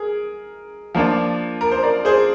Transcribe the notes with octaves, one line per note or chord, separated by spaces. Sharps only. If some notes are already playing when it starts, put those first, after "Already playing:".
Already playing: G#4 A#4
F3 A#3 D4 F4
A#4
C5
A#4 D5
G#4 C5